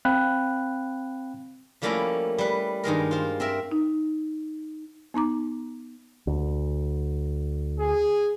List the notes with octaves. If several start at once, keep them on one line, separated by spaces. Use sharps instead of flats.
C4 F5 G5 B5 F#6
F3 G3 A3 A#3 C#4 E4
G3 B4
G2 D#3 G#3 A#4
F4 C5
C4 A#4 E5
D#4
B3 D#4 A#5 D6
D2
G#4